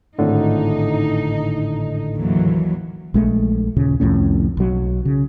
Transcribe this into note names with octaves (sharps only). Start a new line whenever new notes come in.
G#1 A2 D3 D#4
D#2 E3 F#3
A#1 G#3 A3
D#2 A#2 C#3
C2 F2 A2 C#4
B1 F#3
C#3